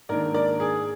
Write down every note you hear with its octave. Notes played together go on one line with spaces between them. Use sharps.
G#2 D#3 A#3 D4 A#4 D5
A#4 D5
G#4